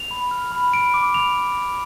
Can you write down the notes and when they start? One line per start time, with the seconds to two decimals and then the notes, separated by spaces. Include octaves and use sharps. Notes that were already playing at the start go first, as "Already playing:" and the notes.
Already playing: F7
0.11 B5
0.31 F6
0.52 B5
0.73 B5 D7
0.94 D6
1.14 B5 F7